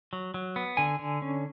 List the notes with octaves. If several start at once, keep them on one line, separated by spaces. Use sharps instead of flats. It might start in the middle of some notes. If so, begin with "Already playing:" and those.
F#3
F#3
B3
D3 G#5
D3
C#4